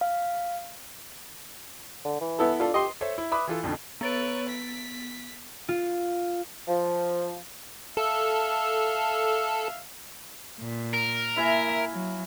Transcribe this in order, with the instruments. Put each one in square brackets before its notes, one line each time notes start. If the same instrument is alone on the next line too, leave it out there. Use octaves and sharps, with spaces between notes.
[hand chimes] F5
[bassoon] D3
E3
[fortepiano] B3 E4 A4
[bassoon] D4 [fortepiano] F4 A4
[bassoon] G4 [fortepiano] D#5 C6
[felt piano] A4 C5 C#5 E5
E4
B4 E5 B5 D6 D#6
E3 F4 A4
B1 F2 B2 D3
[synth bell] B3 A6 D7 [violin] B4 C#5
[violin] B6
[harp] F4
[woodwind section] F3
[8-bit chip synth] A4 [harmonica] E5 F5
[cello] A#2
[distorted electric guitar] A#4
[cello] A#3 E5 [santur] E4 F5 G#5
[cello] F#3